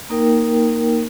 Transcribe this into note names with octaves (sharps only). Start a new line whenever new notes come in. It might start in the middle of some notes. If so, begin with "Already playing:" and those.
A#3 D#4 A#4 G5